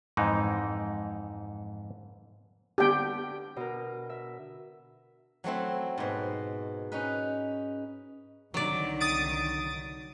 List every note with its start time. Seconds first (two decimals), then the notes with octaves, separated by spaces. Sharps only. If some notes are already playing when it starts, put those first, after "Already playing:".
0.17 F2 G#2 E3 D#4
2.78 D3 B3 D4 G4 G5
3.56 B2 A#4
4.10 E5
5.44 F#3 A3 C4 E4
5.98 G#2 B2
6.92 C#4 D#4 B4
8.54 C2 D3 D#3 F#3 D5
9.00 D#6 A6 D7